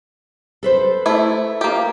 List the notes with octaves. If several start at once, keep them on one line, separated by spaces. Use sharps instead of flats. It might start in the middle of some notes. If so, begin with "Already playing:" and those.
A4 B4 C5
A3 E4
A#3 G4